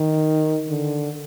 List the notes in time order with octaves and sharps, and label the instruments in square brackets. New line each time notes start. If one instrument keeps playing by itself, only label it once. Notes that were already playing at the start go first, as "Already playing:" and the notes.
Already playing: [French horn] D#3
D3